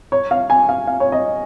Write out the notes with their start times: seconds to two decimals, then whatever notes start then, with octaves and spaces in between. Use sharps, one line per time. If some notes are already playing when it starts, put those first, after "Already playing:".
0.12 C#5
0.31 F5
0.50 G#5
0.69 F5
0.87 F5
1.00 C#5
1.12 D#5